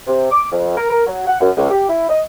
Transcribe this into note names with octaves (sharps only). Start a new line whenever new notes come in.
C3
D6
F2
A#4
A#4
F#3
F#5
F#2
C#2
G4
E4
D#5